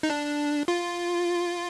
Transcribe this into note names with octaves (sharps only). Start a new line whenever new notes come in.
D#4
D4
F4